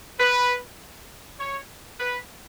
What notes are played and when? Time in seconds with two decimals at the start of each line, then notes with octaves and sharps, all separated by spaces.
0.20 B4
1.39 C#5
2.00 B4